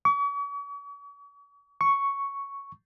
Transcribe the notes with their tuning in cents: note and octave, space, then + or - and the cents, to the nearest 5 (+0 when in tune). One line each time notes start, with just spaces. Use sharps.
C#6 +45
C#6 +5